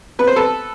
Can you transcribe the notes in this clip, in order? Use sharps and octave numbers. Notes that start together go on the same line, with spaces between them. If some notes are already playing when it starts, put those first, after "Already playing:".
B3 B4
C5
A4 B4